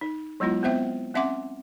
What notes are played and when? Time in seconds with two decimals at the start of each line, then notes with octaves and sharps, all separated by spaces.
0.01 D#4
0.40 F#3 G#3 B3 E4 F4
0.63 B3 C4 C5 E5 G5
1.14 C4 C#4 E5 F#5 C6 D6